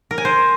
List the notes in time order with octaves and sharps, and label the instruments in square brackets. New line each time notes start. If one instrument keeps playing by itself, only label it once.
[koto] A#4
G#5
C5